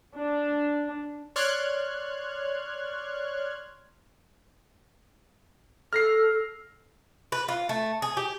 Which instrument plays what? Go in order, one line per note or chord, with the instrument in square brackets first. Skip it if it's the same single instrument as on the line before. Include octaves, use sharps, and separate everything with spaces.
[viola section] D4
[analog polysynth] C#5 D5 C6 F6 F#6 G#6
[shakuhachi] A4 [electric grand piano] F6 A#6 C7
[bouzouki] B4
F4
A3
G#4
G4